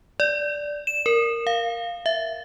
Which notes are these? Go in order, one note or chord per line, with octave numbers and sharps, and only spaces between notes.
D5
E7
A#4
F5
E5